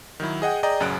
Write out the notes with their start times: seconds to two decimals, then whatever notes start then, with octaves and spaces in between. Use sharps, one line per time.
0.20 D#3 F#3 E4
0.42 G#4 D#5 F#5 G5
0.63 G#4 D5 D#5 G5 A#5
0.80 A1 F#2 C#3 F#3 F#6 D7